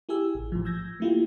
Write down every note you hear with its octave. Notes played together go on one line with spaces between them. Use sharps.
E4 G4 G#4 G#5 E6
A1
A2 F3
E6 G6 G#6 A#6
A3 A#3 E4 F4 G4